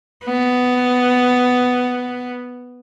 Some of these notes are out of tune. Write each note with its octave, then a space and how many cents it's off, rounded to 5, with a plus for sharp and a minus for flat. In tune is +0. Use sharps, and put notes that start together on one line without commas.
B3 +10